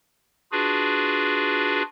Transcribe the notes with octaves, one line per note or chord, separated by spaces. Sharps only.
D4 F4 F#4 G#4 B4